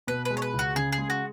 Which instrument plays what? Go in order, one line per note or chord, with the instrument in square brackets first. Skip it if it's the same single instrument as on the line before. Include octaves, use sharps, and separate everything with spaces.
[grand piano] B2 [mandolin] B4
[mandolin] B4
[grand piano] G#3
[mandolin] C#5
B4
[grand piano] C#2
[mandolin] F#4
[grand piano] C#3 [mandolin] G#4
[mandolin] G#4
[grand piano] G#3
[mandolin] F#4